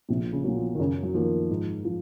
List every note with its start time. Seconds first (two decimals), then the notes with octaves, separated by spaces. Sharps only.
0.09 A#1 C3
0.33 C#3
0.44 A#2 F#3
0.56 F3
0.75 D#3
0.79 F#2 C#3
1.03 F#3
1.14 D#3 F3 A#3
1.50 G#2
1.85 F3